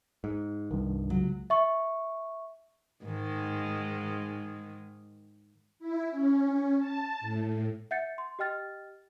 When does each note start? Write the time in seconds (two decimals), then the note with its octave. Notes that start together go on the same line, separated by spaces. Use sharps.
0.24 G#2
0.71 C2 G2 D#3
1.10 C#2 F#3
1.50 E5 C#6
3.03 G#2 D#3 G#3
5.80 E4
6.11 C#4
6.78 A5
7.21 A2
7.91 E5 F#5 G6 A6 C#7
8.18 C6
8.39 G4 D#5 G5 F6 A6